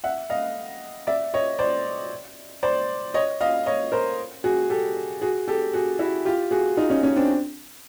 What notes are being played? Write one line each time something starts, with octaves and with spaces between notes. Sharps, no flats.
E5 F#5
D#5 F5
D5 E5
C#5 D#5
C5 D5
C5 D5
C#5 D#5
D#5 F5
C#5 D#5
A#4 C5
F#4 G#4
G4 A4
F#4 G#4
G4 A4
F#4 G#4
E4 F#4
F4 G4
F#4 G#4
D#4 F4
C#4 D#4
C#4 D#4
C4 D4